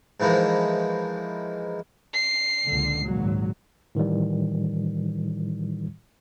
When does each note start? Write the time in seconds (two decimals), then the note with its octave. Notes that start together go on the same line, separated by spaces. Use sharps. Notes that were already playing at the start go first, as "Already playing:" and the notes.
0.20 G#2 E3 F3 G#3 A#3
2.13 C7
2.66 C#2 A#2 D3
3.07 G#1 A#2 F#3
3.95 A2 D#3 E3 G3